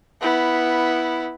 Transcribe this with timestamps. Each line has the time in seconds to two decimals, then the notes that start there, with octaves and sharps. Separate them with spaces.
0.21 B3 E4